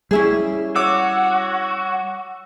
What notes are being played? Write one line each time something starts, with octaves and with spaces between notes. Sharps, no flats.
G3 C#4 E4 G#4
F#4 C#5 D6 E6